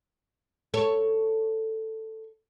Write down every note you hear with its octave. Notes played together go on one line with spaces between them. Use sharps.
A4 C#5